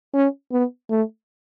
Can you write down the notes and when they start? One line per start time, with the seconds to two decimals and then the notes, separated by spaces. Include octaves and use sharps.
0.14 C#4
0.52 B3
0.90 A3